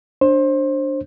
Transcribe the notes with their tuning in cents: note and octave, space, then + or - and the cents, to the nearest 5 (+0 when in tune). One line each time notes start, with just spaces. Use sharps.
D4 +0 C5 +25